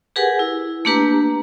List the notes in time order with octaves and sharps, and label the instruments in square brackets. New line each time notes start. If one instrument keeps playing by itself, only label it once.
[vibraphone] G4 G#4 A#4 B4 F#5 G#5
E4
A3 A#3 D4 G4 B4 A#5